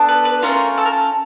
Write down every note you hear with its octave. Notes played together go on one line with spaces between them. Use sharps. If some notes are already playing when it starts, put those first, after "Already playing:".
Already playing: B3 D4 A4
B4
B4
A3 C#4 F4 A#4
A4
A#4
A4